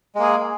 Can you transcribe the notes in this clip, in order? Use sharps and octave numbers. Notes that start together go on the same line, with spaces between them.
G#3 A#3 G#4